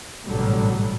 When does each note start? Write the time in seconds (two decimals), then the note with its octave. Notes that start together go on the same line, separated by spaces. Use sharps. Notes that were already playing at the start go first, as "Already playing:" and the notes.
0.25 A1 G#2 B2 D3 F#3 G3